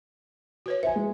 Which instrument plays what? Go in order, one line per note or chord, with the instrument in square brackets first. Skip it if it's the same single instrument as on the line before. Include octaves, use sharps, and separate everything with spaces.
[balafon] F#4 B4 C#5
[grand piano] C5 G#5 [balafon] E5
[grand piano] G#3